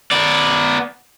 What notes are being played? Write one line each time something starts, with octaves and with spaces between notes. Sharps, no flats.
B3 D5